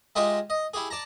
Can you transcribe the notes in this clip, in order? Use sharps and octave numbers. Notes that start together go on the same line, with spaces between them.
G#3 D#4 F4 G4 D#5 E5
D#5
E4 G4 G#4
D5 A5 A#5